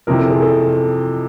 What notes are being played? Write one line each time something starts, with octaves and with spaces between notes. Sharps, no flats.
F2 C3 E3 A#4
A4
G#4
A4